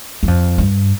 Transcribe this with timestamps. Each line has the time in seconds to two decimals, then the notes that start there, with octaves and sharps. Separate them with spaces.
0.23 F#2
0.28 F2
0.58 G2